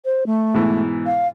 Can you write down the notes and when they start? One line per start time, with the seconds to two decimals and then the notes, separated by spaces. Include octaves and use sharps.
0.05 C5
0.26 A3
0.54 G#2 B2 E3
1.06 F5